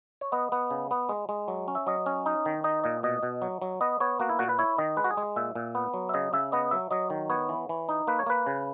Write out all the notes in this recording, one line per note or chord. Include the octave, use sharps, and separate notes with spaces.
C#5
B3 D#5
B3
C#3
B3
G#3
G#3
F#3
C#4
E5
F#3 D#5
C#4
D#4
D#3
D#4 D#5
A#2 D#5
B2 D#5
B2
F#3
F#3
B3 D#5
B3 C#5
A#3 F#4
E4
A#2 F#4
B4
E4 C#5
D#3 D#5
G#3 B4
F#4
G#4
G#3
A#2 E5
A#2
B3
F#3
E5
C#3 D#5
C#3 E5
B3 D#5
F#3 E5
F#3 D#5
D#3
B3 C#5
E3
E3
D#4
A#3 B4
C#5
A#3 B4
C#3